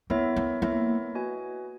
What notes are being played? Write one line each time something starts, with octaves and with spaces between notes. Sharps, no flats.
A#3 B3 E4 A#4 C#5 E5
A#3
A#3 B3 E4 A#4 C#5 E5
F#4 B4 D#5 G#5